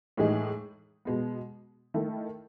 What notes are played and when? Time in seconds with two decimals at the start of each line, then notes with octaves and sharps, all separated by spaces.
0.17 A2 E3 G#3 D#4 G#4
1.05 B2 G#3 B3
1.94 D#3 A3 E4 A4